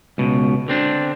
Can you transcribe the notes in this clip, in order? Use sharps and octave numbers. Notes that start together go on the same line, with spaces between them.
C#2 B2
D3 C4 D4